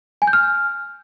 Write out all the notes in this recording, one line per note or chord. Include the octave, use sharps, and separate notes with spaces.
G#5
G6
F6